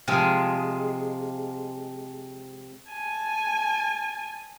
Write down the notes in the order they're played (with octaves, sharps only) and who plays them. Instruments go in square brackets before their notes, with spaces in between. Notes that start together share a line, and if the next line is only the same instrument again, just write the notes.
[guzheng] C3 F3 G#3 F4 G#4
[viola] G#5 A5